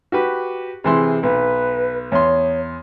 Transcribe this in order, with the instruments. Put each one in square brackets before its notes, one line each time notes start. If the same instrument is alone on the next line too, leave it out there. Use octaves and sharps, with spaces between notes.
[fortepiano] F#4 G4 B4
[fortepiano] C3 E3 C6 [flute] G#4
[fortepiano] B1 [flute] B4
[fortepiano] E2 C6 [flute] C#5